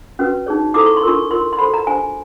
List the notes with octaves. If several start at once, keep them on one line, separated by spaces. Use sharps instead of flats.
C#4 F#4 B4
D#4 G#4 C#5
E4 A4 C5 D6
C#6
C6
D4 F4 A#4 C#6
F4 A#4 C#5 C6
C6
F#4 A4 C5 B5
A#5
D4 G4 C5 G#5